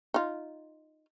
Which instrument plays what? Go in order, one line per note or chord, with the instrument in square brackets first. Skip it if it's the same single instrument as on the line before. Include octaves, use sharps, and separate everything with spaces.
[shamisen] D#4 F4